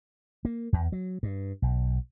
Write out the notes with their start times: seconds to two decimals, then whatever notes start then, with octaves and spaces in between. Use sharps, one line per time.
0.45 A#3
0.73 E2
0.92 F#3
1.23 G2
1.62 B1